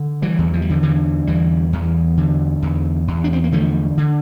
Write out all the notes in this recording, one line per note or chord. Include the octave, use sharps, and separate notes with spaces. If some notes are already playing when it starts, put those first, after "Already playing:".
Already playing: D3
E3 G3
E2
F3
G3
D3 F3
D3 E3
E2 E3 G3
E2
D3
E2
E2
D4
C4
A#3
D3 F3 A3
D3